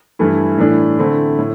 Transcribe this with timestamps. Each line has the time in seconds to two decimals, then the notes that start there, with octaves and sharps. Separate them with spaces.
0.19 G2 E3 A3 E4
0.58 A2 E3 A3 D4
0.99 D3 A3 C4 E4
1.39 A2